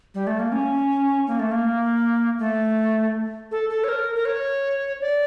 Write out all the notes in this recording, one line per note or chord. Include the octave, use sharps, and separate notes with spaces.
G3
A3
A#3
C#4
A#3
A3
A#3
A3
A4
A4
C#5
A#4
A#4
C#5
D5